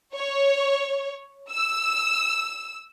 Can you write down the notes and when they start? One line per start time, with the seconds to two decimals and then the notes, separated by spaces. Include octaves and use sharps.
0.15 C#5
1.51 E6